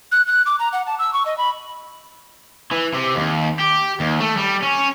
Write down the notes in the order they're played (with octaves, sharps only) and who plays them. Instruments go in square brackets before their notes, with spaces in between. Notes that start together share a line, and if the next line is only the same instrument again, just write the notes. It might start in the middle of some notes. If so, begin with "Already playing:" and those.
[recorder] F#6
F#6
D6
A#5
F#5
A5
E6
C#6
D#5
B5
[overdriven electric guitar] E3
C3
D#2
G4
D#2
A3
G3
C#4